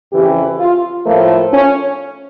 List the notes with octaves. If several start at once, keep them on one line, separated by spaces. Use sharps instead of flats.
F2 C#3 E3 G4
F4
A2 F3 A3 A#3
C#4